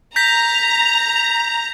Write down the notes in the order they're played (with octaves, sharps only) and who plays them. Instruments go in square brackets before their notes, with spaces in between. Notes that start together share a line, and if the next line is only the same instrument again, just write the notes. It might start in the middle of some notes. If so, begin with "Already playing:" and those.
[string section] A#5 [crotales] G6 A#6 B6